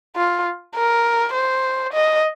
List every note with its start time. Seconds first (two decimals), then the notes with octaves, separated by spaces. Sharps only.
0.16 F4
0.75 A#4
1.34 C5
1.93 D#5